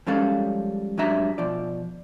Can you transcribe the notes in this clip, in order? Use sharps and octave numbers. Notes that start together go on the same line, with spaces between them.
F3 G3 G#3 C#4 A4 F5
G#2 F#3 G3 D4 E5 A#5
B2 F3 D5